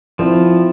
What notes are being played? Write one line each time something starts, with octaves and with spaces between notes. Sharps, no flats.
F3 C4 E4